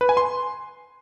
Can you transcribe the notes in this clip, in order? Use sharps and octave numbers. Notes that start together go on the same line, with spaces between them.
B4
G#5
C6